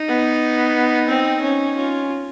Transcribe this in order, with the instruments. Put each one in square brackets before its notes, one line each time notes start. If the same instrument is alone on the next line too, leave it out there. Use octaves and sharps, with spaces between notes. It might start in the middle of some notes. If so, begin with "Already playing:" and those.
Already playing: [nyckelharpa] D#4
[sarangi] B3
C4
C#4
[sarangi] C#4 [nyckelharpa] F4